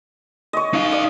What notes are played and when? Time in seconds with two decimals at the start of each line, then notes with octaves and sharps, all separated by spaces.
0.53 C#5 D#5
0.73 D#4 F5
0.92 D5